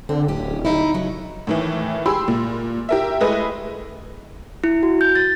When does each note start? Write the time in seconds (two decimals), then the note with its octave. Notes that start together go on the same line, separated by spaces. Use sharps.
0.09 D3 C4
0.28 D1 C#4 G4
0.65 D#4 E4
0.94 C#3 F#3
1.47 A2 D#3 E3
2.06 G4 G#4 B5 C6 E6
2.28 A#2
2.89 G4 A#4 E5
3.21 G#3 A3 E4 G#4 B4 D#5
4.64 E4
4.83 F#4
5.01 G6
5.15 A6